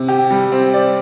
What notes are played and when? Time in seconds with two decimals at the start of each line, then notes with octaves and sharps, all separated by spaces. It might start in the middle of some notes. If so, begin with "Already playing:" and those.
Already playing: C3
0.08 G4
0.30 G3
0.52 C4
0.73 D5